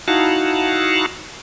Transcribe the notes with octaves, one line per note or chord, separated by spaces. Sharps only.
D#4 E4 F#4 F5 F#5 A5